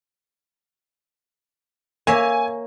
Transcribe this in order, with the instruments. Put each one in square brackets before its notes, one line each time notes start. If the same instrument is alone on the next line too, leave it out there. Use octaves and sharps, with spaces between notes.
[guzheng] A#3 C#5 E5 [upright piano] G#5